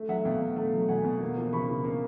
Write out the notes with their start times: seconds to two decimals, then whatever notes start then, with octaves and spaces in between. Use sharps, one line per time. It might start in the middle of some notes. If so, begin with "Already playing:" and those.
Already playing: A3
0.09 F#3 E5 F#5
0.25 B2 F5 G5
0.41 B2
0.57 A3
0.73 F#3
0.88 B2 F#5 G#5
1.04 B2
1.20 A#3
1.37 F3
1.52 C#3 B5 C#6
1.69 C#3
1.84 A#3